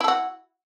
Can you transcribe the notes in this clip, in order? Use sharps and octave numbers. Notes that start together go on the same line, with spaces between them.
E4 F#4 A4